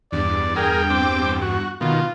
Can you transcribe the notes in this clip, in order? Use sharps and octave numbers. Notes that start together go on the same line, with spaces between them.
E2 G2 D5
G#4 A#4 G5
C4 D6
F#4
B2 D#3 F4